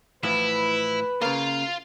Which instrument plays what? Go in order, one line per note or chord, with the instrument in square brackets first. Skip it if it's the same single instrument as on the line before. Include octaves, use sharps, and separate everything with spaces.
[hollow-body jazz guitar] A2 E3 F3 [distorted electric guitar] E4 [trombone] B4
[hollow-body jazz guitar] C#3 A#3 [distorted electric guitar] F4 F5